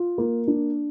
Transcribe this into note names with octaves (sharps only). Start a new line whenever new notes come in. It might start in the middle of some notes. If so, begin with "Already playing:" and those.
Already playing: F4
A#3
D4